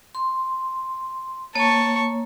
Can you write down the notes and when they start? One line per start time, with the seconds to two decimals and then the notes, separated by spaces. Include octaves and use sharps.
0.15 C6
1.55 A#3 C#5 A5 C#6